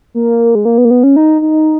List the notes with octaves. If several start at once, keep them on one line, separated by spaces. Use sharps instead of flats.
A#3
G#3
A#3
B3
A#3
B3
C#4
D#4
D#4